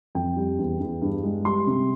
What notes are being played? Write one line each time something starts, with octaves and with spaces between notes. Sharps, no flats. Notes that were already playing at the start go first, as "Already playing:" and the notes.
F2 G5
G3
E2
E2
G2
G#3
G3 C6
C3